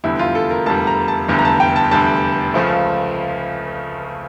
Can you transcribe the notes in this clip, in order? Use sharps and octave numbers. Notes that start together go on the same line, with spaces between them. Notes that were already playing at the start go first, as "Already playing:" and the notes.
F1 E2 D3 G3 E4
F4
A4
A#4
F1 E2 D3 G3 A5
A#5
A5
F1 E2 D3 G3
A#5
A5
G5
A5
F1 E2 D3 G3 A5
C#2 C#3 F3 A3